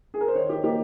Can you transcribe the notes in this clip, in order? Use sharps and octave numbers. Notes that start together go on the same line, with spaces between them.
G#4
A#4
C5
D#3 C#5
G4
A#3 D#4 G4